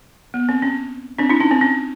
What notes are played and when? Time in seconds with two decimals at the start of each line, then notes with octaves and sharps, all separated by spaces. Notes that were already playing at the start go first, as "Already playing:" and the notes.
0.34 B3
0.49 C4
0.62 C#4
1.19 C4 D4
1.29 D4 E4
1.40 C#4 D#4
1.51 C4
1.61 C#4